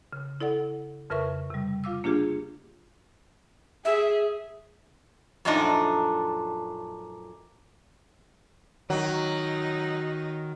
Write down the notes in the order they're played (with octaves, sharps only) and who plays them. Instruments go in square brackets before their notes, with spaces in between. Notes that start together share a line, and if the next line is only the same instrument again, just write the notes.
[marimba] C#3
E4 A4 D5 F#5
F2 C#3 A#4 B4 E5 C#6
C3 G3
F4 F5 D6 E6
A#3 D4 F4 G4 G#4
[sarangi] G#4 [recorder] E5
[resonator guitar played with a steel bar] F#2 A#2 F3 A3 D4 D#4
[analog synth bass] D#3 [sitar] F#3 [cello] D#4